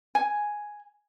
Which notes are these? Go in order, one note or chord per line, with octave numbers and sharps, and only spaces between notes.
G#5